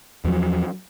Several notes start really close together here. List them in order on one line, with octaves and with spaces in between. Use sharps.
E2 F#3 F3